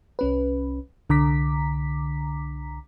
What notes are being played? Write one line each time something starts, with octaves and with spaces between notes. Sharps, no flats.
C2 C#4 B4
C2 D3 A#5 D6 B6